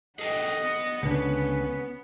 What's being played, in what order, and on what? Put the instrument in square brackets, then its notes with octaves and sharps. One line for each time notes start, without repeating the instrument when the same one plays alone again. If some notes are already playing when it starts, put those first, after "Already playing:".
[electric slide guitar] G#4 A4 G5 [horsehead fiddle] D#5 F#5
[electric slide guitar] B3
[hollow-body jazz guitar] C#2 D3 [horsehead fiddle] C#4 B4